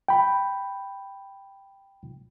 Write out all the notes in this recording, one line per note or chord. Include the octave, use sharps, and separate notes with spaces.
G5 B5